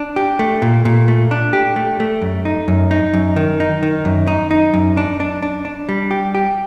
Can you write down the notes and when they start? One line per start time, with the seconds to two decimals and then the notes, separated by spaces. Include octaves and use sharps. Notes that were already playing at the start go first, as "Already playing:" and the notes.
Already playing: D4
0.16 G4
0.39 A3
0.62 A#2
0.85 A#2
1.08 A3
1.31 D4
1.53 G4
1.76 A3
2.00 A3
2.22 F#2
2.45 D#4
2.68 F#2
2.91 D#4
3.14 F#2
3.36 D#3
3.60 D#4
3.83 D#3
4.05 F#2
4.27 D#4
4.51 D#4
4.74 F#2
4.97 D4
5.20 D4
5.43 D4
5.65 D4
5.89 G3
6.11 G4
6.35 G4